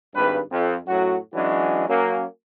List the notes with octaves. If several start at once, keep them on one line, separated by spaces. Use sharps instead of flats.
G#1 G2 B4
F2
F#2 A2 F#3 F#4
E3 F#3 G#3 C#4 D4 F#4
F#3 A#3 C#4